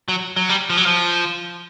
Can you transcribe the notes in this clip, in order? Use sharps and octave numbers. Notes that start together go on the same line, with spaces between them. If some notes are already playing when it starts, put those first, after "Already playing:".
F#3
F#3
G3
F3
F#3
F3